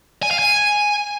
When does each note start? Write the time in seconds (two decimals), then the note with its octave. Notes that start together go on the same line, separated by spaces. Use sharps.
0.23 G#5
0.31 F5
0.39 G#5